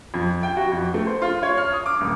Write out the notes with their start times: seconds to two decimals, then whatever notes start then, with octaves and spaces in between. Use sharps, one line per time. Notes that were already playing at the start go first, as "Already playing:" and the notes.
0.14 F2
0.43 G5
0.57 F#4
0.72 F2
0.94 A3
1.07 C5
1.22 F4
1.43 C#5
1.58 F6
1.73 D#6
1.86 D6
2.01 D#1